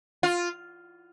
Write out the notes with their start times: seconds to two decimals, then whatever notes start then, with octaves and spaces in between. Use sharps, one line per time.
0.23 F4